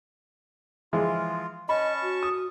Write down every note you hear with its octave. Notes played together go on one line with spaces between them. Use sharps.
E3 F3 G#3 F4
C#4 D#5 A5 B5 C#6
F#4
D#6